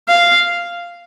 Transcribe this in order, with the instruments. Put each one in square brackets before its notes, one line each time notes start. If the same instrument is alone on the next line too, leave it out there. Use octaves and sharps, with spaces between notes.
[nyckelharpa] F5